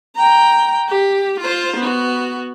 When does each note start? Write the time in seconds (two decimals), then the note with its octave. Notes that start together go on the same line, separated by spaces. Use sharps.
0.16 G5 A#5
0.88 G4
1.40 F4 C5
1.77 B3 F#4